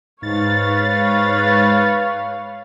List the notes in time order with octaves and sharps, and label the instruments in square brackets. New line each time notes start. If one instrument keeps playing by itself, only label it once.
[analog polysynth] G#2 A6 [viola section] B4 C#5 F5